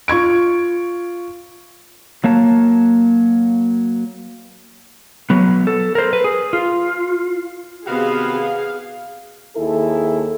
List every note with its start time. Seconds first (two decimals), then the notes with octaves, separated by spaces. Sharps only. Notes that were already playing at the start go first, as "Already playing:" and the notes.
0.08 F4 C#6 G#6 D7
2.24 F#3 A#3 C#5 A5
5.30 F#3 B3
5.67 A4
5.95 A#4 C5
6.13 B4
6.24 G#4
6.53 F4
7.87 C3 D#3 B3 F#4 G#4 F5
9.56 D#2 E4 G#4 A4